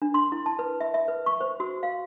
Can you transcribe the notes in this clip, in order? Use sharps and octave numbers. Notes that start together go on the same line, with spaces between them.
D4
C6
E4
A5
B4
E5
E5
B4
C#6
C5
F#4
F5